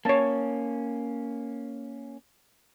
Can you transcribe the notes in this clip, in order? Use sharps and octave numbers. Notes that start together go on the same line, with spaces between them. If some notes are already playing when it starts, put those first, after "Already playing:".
A#3 C#4 C#5 A5